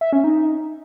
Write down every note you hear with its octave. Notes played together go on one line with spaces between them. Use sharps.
E5
C#4
D#4